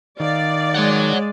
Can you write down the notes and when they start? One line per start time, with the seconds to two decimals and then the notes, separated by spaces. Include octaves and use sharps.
0.20 D#3 D5 F5
0.75 G#3 C#5 F#5